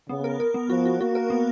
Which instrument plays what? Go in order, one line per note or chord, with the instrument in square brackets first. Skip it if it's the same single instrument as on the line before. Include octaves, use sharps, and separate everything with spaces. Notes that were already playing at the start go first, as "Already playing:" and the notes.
[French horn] C#3 [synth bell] B3
[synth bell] A#4
A#4
B3
[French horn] F3 [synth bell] F#4
[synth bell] F#4
[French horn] A#3 [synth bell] F#4
[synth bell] A#4
B3